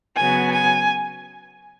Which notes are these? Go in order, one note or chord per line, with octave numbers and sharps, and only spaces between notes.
C#3 F#3 B3 G#5
G#5